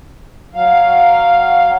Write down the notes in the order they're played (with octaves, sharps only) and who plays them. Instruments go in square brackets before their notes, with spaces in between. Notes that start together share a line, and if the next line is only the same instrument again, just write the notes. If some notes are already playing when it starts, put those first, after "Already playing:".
[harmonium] F#3 F5